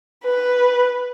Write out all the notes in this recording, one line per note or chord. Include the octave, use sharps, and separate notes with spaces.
B4